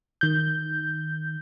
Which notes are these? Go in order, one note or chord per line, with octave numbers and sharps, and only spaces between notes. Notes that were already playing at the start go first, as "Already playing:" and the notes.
D#3 G6